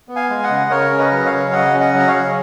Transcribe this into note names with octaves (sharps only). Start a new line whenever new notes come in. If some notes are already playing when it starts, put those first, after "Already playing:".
B3
F5 G#5
G#3
D#5 F#5
C#3
C#3 A#4 C#5
C#4
B4 D#5
F#3
C#5 F5
C#3
C#3 D#5 F#5
C#4
D#5 F#5
F#3
D#5
C#5 F5
C#3